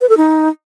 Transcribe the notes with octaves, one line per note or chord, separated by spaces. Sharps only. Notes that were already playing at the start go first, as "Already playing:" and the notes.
B4
A4
D#4